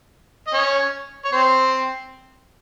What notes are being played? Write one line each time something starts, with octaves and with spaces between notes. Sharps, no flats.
D#5
C#4 C#5
C#5
C4 C5